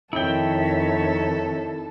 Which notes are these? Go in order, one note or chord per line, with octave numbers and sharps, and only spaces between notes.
F2 D#3 E4 A4 C#5 D#5 E5 G5